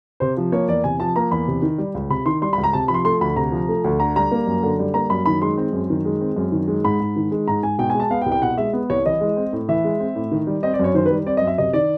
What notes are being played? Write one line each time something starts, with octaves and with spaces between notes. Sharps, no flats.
C3 C5
F3
A#3 C#5
E2 D5
C3 G#5
F3 A5
A#3 A#5
E2 B5
C3
D#3
G3
C#2
C3 B5
D#3 C6
G3 C6
B5
C#2
A#5
C3 A5
F3 B5
C6
A3 C6
D2 B5
C3 A#5
F3
A3
D2
D3 A#5
G3 A#5
A#3
F#2
D3
G3
A#3 A#5
F#2 B5
D#3 B5
G#3 C6
C4
F#2
D#3
G#3
C4
F#2
D#3
G#3
G#2 B5
G#2
D#3
G#3
G#2 A#5
G#2 G#5
B2 G5
G#5
G#3 A5
B3 F5
G5
C2
G5
B2 F#5
G#3 E5
B3
C2 C#5
E3 D#5
G#3
C4
A2
E3 E5
G#3
C4
A2
D#3
G3
C4 D#5
D5
F#2 C#5
D#3 C5
B4
G3
C4 D5
D#5
F#2
E5
C3 D#5
D#3 D5